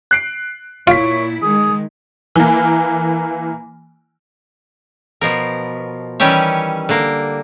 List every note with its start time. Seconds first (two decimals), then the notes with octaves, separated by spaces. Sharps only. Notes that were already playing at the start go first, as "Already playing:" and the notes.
0.11 F#6 C7 D7
0.87 A#2 E4 F4 C#5 B6 D7
1.42 D#3 G#3 G#4
2.36 E3 A#3
5.21 B2 F3 A#4
6.20 D#3 E3 G3 C#4 G4 C#5
6.89 D3 A#3